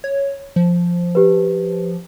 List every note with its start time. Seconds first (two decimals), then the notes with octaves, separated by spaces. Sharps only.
0.04 C#5
0.56 F3
1.15 G4 B4